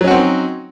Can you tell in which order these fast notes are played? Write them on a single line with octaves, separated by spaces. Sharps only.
F#3 C#4 F#4 C4 D#4